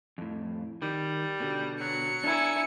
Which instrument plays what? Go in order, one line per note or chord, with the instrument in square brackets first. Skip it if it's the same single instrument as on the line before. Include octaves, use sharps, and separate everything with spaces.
[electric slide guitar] F2 A2
[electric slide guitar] D#3 [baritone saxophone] G3
[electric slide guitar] B2 D3
[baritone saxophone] F#3 [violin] C#7
[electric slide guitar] D4 A#4 [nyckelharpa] E4 G#5